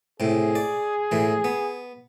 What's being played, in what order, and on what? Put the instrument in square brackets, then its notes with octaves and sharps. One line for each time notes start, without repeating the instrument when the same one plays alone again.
[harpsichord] A2 C3 [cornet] G#4
[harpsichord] D5
A2 E3
B3